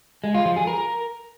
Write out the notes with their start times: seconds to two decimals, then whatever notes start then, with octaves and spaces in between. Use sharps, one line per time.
0.24 G#3
0.34 F4
0.45 F3
0.56 G#4
0.67 A#4